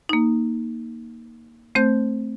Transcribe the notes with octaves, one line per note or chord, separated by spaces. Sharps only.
A#3 D#4
A3 C4 C5 G6